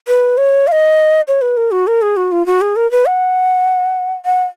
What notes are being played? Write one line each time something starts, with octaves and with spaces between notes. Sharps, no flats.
B4
C#5
F5
D#5
C#5
B4
A#4
F#4
A#4
G#4
F#4
F4
F#4
G#4
A#4
B4
F#5
F#5